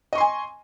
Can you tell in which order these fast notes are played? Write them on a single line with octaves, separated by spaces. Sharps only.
D#5 C#6 C6 G#5